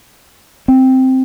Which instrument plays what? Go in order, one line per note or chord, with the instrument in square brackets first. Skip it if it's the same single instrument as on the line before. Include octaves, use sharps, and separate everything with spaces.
[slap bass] C4